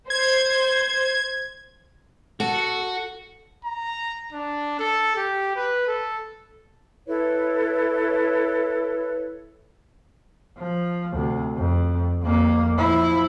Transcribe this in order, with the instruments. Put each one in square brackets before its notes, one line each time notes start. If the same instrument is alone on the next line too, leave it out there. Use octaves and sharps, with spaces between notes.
[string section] C5 [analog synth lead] G#6
[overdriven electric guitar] F#4 [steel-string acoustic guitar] A4
[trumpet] A#5
D4
A4
G4
B4
A4
[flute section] E4 A4 B4 C#5
[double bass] F3
D2 C3
F2
F2 A#3
F3 E4